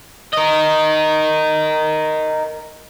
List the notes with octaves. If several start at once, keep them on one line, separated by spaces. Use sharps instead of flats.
A#4 D#5